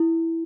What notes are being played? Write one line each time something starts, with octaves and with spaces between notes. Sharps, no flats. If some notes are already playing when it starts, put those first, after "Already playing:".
Already playing: E4